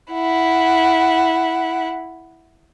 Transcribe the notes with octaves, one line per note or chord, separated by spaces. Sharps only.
E4 F#5